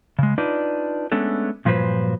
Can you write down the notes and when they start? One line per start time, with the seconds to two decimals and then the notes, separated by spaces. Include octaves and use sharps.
0.19 C#3 G#3
0.38 D4 D#4 F4 B4 D5
1.12 G#3 A3 B3 C#4 D4 A4
1.65 G2 A#2 F3 F#3 B4 C5